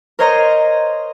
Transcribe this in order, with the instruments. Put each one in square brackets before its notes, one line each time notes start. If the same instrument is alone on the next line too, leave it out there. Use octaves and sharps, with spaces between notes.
[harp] A#4 C5 C#5 D#5 A#5 C6